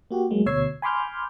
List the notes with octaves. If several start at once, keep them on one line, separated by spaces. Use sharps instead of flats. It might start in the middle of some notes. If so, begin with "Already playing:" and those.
A#3 F#4 G4
F#3 G#3 A#3
D2 B2 C#5 E6 G#6 C7
G#5 B5 C6 D6 F6 G6